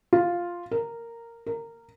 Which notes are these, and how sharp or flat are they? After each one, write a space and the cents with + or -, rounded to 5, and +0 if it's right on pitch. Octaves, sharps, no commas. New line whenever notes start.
F4 +0
A#4 -10
A#4 -15